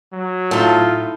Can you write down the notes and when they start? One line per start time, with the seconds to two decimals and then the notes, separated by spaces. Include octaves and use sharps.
0.13 F#3
0.51 A2 D#4 F4 A4